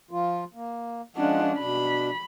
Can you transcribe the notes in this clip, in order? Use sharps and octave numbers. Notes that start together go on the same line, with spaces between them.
F3 F4
A#3
F3 G#3 C#4 D4 F#5
B2 D4 B5